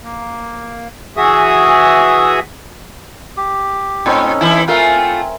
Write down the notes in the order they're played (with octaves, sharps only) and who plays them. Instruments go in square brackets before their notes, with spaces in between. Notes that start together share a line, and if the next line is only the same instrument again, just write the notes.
[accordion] A#3
E3 F#4 G#4 E5 D#6
[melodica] G4
[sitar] A2 [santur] C4 B4 C#5 [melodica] C#4 D#4 A4
[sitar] E3 E4
[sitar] A3 F4 [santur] A#4 E5 G#5
[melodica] C4